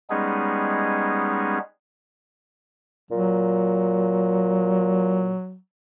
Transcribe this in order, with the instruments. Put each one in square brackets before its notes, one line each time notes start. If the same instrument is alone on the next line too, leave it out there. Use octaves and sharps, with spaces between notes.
[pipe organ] G3 G#3 B3 C#4 D#4 G#4
[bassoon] A#2 [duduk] F#3